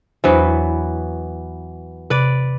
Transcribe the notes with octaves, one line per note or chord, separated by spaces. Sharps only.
E2 E3 F#3 B3 D4 C5
C3 B4 D5